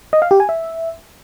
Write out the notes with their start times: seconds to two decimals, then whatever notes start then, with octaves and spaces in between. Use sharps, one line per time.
0.13 D#5
0.22 F5
0.31 G4
0.40 G#5
0.49 E5